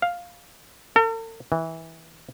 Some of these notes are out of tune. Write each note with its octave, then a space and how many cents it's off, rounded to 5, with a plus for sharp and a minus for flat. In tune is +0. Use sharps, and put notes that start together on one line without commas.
F5 +5
A4 +45
E3 -20